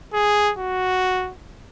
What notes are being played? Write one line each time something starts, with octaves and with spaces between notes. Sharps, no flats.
G#4
F#4